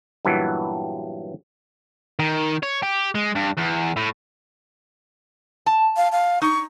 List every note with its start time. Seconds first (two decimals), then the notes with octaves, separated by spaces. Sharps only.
0.25 G2 A#2 E3 F#3 B3
2.19 D#3
2.63 C#5
2.83 G4
3.15 G#3
3.35 G2
3.57 E2
3.96 A2
5.66 A5
5.96 F5
6.12 F5
6.42 D#4 C#6